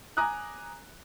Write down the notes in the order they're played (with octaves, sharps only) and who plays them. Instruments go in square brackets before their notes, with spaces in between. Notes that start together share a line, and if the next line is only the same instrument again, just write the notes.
[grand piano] G#5 A#5 D6 D#6 F#6